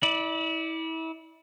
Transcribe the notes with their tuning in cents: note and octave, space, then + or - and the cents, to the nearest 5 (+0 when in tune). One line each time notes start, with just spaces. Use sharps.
E4 -30 D5 +10